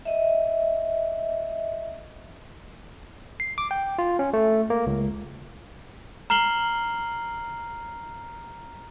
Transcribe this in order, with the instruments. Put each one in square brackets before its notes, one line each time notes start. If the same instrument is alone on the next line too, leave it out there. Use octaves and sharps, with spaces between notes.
[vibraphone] D#5 E5
[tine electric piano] C7
D6
G5
F4
C#4
A3
A#3
C#2
[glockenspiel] A#5 F6 C7 F#7 G7